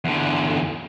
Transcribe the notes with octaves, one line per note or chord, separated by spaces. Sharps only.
E2 D3